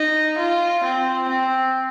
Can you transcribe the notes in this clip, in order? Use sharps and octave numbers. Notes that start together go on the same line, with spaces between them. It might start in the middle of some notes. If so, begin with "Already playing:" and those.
Already playing: D#4
F4
C4
C4